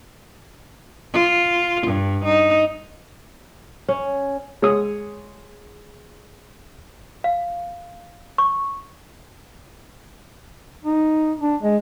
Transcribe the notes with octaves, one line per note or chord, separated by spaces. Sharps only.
F4
G2
D#4
C#4
G#3 C#5 D#6
F5
C#6
D#4
D4
G#3